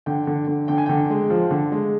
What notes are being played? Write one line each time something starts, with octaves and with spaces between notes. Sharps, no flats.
D3 G5
D3
D3
D3 G5
G#5
D3 G5
G#3
F3
D3
G#3